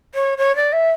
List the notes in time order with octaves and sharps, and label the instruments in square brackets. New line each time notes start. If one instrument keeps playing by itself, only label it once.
[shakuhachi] C#5
C#5
D5
E5